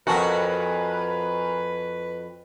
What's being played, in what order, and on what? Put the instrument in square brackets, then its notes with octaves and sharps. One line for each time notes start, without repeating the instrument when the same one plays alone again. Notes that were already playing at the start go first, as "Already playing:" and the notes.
[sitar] F2 F#4 [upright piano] A#4 G#5 A5 [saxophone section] B4